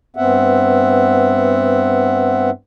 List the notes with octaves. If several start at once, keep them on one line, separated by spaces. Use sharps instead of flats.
G2 B3 C4 E5 F#5